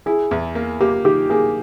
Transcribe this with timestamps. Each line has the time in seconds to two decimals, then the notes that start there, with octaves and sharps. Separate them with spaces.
0.06 E4 G#4
0.31 E2
0.55 A#3
0.81 A#3 G4
1.05 D#3 G4
1.30 A#3 G#4